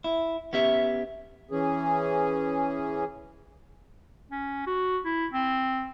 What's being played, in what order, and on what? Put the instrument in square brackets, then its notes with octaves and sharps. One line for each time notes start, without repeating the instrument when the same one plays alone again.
[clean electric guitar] E4
B3 C#4 G4 E5
[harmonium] E3 C#4 G#4
[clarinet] C#4
F#4
E4
C4